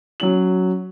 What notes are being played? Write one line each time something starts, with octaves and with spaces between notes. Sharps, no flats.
F#3 C#4 F#7